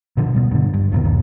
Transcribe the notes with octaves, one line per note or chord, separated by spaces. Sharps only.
B2 D3 F3
B2 G3
G2 D3
G2
D1 D#2 B2
G1 D#2